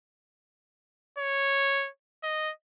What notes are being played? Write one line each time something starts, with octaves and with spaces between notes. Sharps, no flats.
C#5
D#5